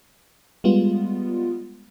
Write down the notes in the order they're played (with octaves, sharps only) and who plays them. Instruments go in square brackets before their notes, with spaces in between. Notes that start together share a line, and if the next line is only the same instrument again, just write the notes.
[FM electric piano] G3 G#3 B3 F4